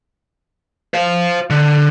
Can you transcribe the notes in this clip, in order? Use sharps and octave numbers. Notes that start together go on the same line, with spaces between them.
C5 F5
D3